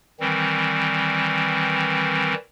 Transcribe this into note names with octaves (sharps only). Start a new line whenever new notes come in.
D#3 E3 G3 C4